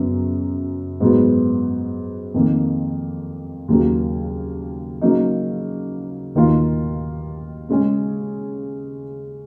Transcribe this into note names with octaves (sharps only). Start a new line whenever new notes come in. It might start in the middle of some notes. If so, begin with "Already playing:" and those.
Already playing: F#2 C#3 F#3 B3
G#2 F#3 B3
F2 D#3 A#3
D#2 C#3 F#3 A#3
C#3 F#3 A#3 D#4
D#2 D#3 A#3 F4
C#3 G#3 C#4 G#4